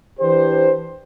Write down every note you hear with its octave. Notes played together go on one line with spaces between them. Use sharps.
E3 D4 G4 B4 C5